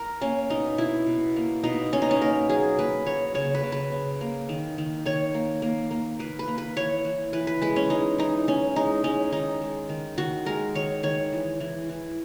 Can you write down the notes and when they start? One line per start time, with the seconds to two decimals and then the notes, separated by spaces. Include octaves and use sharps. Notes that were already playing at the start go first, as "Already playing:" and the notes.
Already playing: A#4
0.21 A#3 C#4
0.50 B2 D#4
0.78 B2 E4
1.07 B2
1.36 A#3
1.63 B2 D#4
1.92 B2 C#4
2.02 D#4
2.11 C#4
2.21 A#3 A#4
2.49 F#3 G#4
2.79 A#3 B4
3.06 F#3 C#5
3.34 C#3 C#5
3.54 B4
3.63 C#3
3.72 B4
3.92 C#3
4.21 A#3
4.49 D#3
4.78 D#3
5.05 D#3 C#5
5.34 A#3
5.62 A#3
5.91 A#3
6.19 A#3 B4
6.39 B4
6.48 A#3
6.58 B4
6.77 E3 C#5
7.05 E3
7.33 E3 B4
7.47 B4
7.62 G#3 B4
7.76 C#4
7.90 G#3 D#4
8.18 E3 D#4
8.47 E3 C#4
8.76 G#3 D#4
9.04 G#3 C#4
9.32 D#3 D#4
9.61 G#3
9.89 D#3
10.18 D#3 F#4
10.46 G#3 A#4
10.75 D#3 C#5
11.03 D#3 C#5
11.33 E3
11.60 E3
11.89 E3